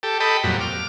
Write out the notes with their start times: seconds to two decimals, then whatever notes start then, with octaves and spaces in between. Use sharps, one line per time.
0.03 G4 A4
0.20 A4 D#5 G5 B5
0.43 F2 A#2 F#3 G3
0.60 D6 F6